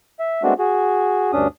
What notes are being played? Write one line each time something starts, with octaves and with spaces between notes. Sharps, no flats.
E5
G#3 A3 B3 C4 D4 F#4
F#4 G#4
D2 G2 C#4 D4 D#6